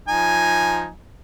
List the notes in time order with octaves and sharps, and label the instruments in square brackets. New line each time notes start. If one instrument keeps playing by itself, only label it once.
[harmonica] F3 D#4 G#5